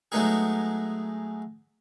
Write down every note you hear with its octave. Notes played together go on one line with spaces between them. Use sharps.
F#3 G#3 A3 B3 D#4 G#4